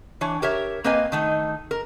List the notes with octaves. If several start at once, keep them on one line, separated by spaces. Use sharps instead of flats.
E3 D4 C#5
G4 A#4 C#5 E5
A#3 C4 B4 D#5 F5 G#5
D#3 A3 D#4
A#4